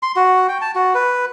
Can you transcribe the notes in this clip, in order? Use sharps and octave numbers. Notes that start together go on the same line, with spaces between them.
C6
F#4
G5
A5
F#4
B4